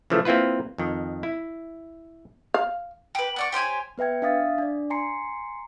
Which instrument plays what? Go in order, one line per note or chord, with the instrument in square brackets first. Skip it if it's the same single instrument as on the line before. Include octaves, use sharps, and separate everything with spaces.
[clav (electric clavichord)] C#3 E3 F3 A3
A#3 C4 E4 F4 B4
F2 D#3
E4
[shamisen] F5
[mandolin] G4 B4
B3 D5 C#6
G4 C5 C#5 G#5
[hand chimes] B3 B4 E5 G5 G#6
D4 E5 F5 D#6 A6
D4 D5
G#5 A#5 C6 C7 C#7